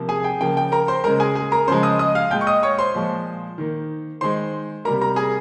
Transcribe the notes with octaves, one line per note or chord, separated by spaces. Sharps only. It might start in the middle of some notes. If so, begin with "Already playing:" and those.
Already playing: C3 F3 A#3
G#4 G#5
G5
C#3 F3 A#3 G5
G5
A#4 A#5
C5 C6
C#3 G#3 A#4 A#5
G#4 G#5
G#4 G#5
A#4 A#5
C#3 F3 G#3 C5 C6
D#5 D#6
D#5 D#6
F5 F6
A#2 G#3 G5 G6
C#6
D#5 D#6
C#5 C#6
C5 C6
A#2 F3 G#3
D#3 A#3
D#3 G#3 C5 C6
C3 G3 A#3 A#4 A#5
A#4 A#5
G#4 G#5